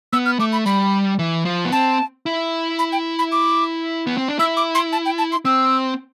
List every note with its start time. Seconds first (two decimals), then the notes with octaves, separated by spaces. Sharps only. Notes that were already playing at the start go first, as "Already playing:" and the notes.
0.13 B3 E6
0.26 F6
0.39 A3 D6
0.52 B5
0.66 G3 B5
1.19 E3
1.45 F3
1.65 B3
1.72 C4 A5
2.26 E4
2.79 B5
2.93 G5
3.19 B5
3.32 D6
4.07 B3
4.17 C4
4.28 D4
4.39 E4 E6
4.57 D6
4.75 C6
4.92 A5
5.06 G5
5.18 A5
5.32 C6
5.45 C4 E6